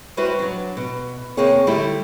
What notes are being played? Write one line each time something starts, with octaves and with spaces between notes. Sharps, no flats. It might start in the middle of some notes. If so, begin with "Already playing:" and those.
G3 E4 F#4 B4 C5
F#3 D4
B2
D#2 C3 A#3 C4 G#4 C#5
D3 G3 A3 D#4 E4